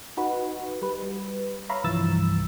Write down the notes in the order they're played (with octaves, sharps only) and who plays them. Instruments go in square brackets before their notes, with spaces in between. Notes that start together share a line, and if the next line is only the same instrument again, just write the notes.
[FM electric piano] D#4 F#4 B4
G3 B4
C#5 E5 F5 A#5 B5
C2 G2 E3 F3 E6 A6